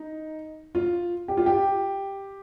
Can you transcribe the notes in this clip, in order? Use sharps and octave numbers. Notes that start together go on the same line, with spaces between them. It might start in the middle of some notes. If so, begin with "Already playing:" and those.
Already playing: D#4
F4
G4
F4
G4